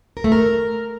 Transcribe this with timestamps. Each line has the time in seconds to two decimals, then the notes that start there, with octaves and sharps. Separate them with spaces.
0.17 A#4
0.24 A3
0.32 A#4